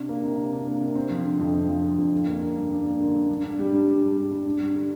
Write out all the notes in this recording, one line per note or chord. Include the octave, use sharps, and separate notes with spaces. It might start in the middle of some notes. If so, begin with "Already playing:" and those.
Already playing: C3 D4
A#3
C3
C3
D4
A#3
C3
C4
F3
D3
F2
C4
F3
D3
F2
D4
A#3
D3
G2
D4
A#3
D3
G2
G2
D4
G3
G2
G2
D4
G3
G2
D4
G3
D3